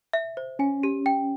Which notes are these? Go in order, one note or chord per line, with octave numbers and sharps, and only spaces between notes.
E5
C5
C#4 G#5
G4
G5